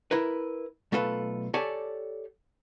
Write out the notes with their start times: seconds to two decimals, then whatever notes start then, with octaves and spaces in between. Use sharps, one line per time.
0.11 E4 A#4 B4
0.92 B1 A3 F4 A4 B4
1.54 G4 A4 C#5 D5 G#5 A5